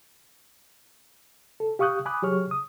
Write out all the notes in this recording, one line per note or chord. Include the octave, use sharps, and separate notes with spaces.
A4
G4 F5 C#6 D#6 F#6 G6
G#5 B5 D6 D#6 F#6
F#3 G4 G#4 C#5 C#6 F6
D#6